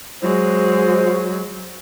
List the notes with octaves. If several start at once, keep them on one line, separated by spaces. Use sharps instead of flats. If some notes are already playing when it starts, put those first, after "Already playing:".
F#3 G#3 F#4 C5